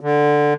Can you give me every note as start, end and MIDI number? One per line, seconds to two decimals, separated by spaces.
0.01 0.54 50